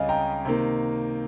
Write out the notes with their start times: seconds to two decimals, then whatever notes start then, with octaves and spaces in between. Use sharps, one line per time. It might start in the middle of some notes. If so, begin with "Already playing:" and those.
Already playing: C#2 C#3 G3 C#4 D#5 F5 G#5
0.09 G5 A#5
0.45 C3 D#3 A#3